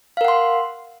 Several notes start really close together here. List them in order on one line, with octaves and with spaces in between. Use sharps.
F5 A#4 F#5 C6